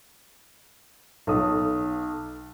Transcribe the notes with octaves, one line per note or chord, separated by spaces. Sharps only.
B1 A4 D#6